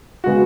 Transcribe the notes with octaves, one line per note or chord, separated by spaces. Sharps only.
C#3 G#3 B3 F#4